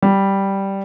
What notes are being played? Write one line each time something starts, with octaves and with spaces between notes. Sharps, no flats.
G3